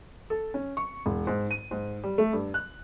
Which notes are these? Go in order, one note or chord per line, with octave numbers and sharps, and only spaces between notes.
A4
C#4
C#6
E1
G#2
D#7
G#2
G3
A3
G2
F#6